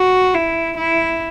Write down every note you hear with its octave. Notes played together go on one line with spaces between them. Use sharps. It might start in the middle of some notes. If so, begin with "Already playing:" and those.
Already playing: F#4
E4
E4